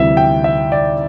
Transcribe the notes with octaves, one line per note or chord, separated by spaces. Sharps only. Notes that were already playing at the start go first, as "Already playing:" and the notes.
Already playing: D2 C3 E3 G3 E5
G5
E5
D5